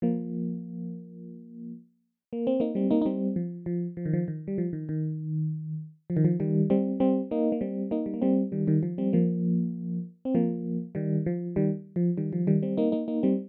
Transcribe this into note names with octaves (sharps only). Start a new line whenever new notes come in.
F3 A#3
A#3
C4
A#3 D#4
G3 C4
A#3 D#4
D#4
G3 C4
F3
F3
F3
D#3
F3
D#3
G3
F3
D#3
D#3
F3
D#3
F3
D#3 G3
G3 C4
G3 C4
A#3 D#4
A#3
G3 C4
A#3 D#4
G3
A#3
G3 C4
D#3 G3
D#3 G3
F3
G3 C4
F3 A#3
C4
F3 A#3
D#3 G3
F3
D#3 G3
F3
D#3 G3
F3
D#3 G3
G3 C4
A#3 D#4
A#3 D#4
A#3 D#4
G3 C4